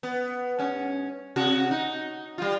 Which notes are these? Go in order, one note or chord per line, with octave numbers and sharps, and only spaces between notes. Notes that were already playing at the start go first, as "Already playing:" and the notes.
B3
G2 C#4
C3 F#4
D#4
G3 F4